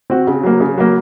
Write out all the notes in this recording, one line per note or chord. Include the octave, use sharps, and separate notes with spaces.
C4 F#4
C#3
F#3 A#3
C#3
F#3 A#3